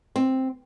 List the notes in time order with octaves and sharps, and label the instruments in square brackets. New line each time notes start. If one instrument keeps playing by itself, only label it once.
[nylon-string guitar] C4